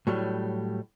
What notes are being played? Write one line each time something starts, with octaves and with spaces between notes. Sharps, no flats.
A2 F#3 G3